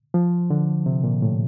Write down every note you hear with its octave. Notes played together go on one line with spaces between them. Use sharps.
F3
D3
C3
A#2
A2